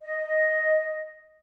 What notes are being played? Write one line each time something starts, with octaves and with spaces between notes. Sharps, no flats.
D#5